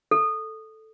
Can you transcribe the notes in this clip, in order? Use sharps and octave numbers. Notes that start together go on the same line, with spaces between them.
A4